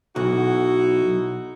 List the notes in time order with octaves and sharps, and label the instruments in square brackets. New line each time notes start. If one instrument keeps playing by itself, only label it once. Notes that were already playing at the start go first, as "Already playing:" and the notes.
[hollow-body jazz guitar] B1 [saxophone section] D#4 E4 F#4